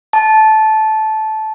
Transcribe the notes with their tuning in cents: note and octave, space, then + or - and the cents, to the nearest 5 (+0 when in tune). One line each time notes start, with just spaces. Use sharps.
A5 -15